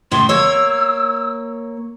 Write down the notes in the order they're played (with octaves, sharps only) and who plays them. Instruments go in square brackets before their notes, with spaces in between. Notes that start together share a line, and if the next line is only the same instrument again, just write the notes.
[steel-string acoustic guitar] A2 C#3 [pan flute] C6
[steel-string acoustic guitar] A#3 C#5 [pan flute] E6